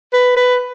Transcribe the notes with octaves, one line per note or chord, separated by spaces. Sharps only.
B4
B4